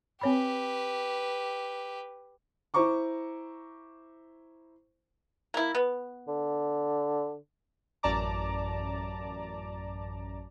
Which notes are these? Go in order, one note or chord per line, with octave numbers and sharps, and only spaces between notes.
C4 G4 B4 C#5 B5
E4 C5 A#5 C#6 D6
A#3 E4
B3
D3
A1 F#2 D5 A5 A#5 D6